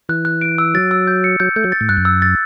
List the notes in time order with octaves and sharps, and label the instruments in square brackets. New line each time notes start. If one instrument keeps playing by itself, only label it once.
[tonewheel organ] E3 [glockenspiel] F#6
[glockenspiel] F#6
D7
E6
[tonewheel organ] F#3 [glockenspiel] A6
[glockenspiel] E6
G6
C#7
[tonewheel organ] F#3 [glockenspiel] G6
[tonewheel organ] A3 [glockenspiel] G6
[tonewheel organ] F#3
[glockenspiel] A6
[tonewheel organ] A2
[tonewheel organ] G2 [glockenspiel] F#6
[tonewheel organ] F#2
[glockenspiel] E6
A6